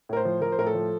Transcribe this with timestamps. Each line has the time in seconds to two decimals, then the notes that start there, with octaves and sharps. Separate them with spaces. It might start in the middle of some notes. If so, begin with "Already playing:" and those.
0.09 A2 A#4
0.17 C5
0.25 F3
0.41 F3 A#4
0.52 C5
0.58 A2 A#4
0.67 A4
0.75 F3